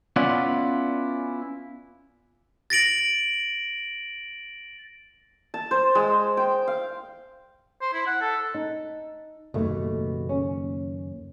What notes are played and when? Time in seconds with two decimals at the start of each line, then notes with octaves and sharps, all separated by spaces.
0.16 B3 C#4 E4 F4 D5 F#5
2.70 A6 A#6 D7 F#7
5.54 A5
5.71 C5
5.95 G#3
6.37 G5
6.67 F5
7.81 C5
7.94 E4
8.07 F#5
8.21 A4
8.54 D#4
9.54 F#1 D#2 B2 A3
10.29 C#4